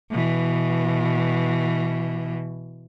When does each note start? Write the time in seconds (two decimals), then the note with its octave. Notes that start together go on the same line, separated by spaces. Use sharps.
0.11 B2 E3